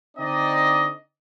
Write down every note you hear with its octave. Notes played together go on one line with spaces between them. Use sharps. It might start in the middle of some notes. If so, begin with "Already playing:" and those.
D3 C4 D4 D#4 D5 D#5